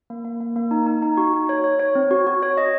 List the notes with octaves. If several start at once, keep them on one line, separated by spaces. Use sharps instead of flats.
A#3
A#3
A#3
A#3
D#4
D#4
D#4
F#4
D#4
C#5
C#5
C#5
C4
F#4
F#4
C#5
D#5